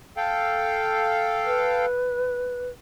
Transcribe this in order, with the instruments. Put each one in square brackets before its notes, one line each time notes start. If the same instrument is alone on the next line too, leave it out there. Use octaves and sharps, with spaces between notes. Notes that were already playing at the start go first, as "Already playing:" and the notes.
[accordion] A4 F5 G5
[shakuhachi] B4